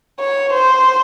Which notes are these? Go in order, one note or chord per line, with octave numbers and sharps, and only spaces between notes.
C#5
C5